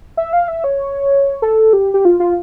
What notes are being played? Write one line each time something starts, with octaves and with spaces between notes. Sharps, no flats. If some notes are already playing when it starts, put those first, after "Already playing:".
E5
F5
E5
C#5
A4
G4
G4
F4
F4